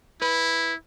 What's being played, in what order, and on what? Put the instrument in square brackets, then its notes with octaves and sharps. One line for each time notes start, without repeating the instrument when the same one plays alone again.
[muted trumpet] E4 [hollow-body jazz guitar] B4